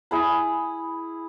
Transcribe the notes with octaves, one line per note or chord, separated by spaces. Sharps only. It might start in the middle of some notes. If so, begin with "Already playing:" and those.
E4 G#4 B5